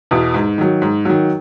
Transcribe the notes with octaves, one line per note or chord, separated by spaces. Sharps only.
E2 B2
G#2
D#3 F#3
G#2
D#3 F#3